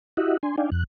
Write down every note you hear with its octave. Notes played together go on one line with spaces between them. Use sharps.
E4 F#4 G4 D#5 E5 F#5
D4 G#5 C6
D4 D#4 D5 F5 G5 G#5
F2 F#6